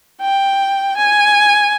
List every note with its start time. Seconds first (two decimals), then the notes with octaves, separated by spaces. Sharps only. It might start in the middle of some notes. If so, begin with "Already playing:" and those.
0.21 G5
0.97 G#5